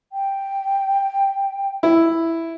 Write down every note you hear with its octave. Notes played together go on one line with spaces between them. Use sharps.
G5
E4